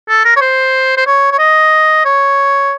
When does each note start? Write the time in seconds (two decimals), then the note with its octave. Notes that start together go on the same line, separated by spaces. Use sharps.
0.09 A4
0.25 A#4
0.36 C#5
0.41 C5
0.97 C5
1.06 C#5
1.32 C#5
1.39 D#5
2.05 C#5